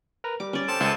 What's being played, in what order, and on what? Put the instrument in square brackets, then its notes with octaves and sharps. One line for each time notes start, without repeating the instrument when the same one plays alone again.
[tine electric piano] A#4 B4 A#5
[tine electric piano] G3 [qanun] D6
[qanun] C#4 D5
[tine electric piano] A4 C5 G5 [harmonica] A5
[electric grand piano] C#2 [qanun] G#5